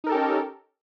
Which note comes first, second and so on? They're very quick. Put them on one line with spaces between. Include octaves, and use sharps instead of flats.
D#4 A#4 A4 G4 C#4